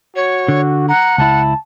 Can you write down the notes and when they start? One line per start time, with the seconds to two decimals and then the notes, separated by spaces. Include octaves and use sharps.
0.16 F#4 C#5
0.48 D3
0.89 F#5 A#5
1.18 C#2 E4 A5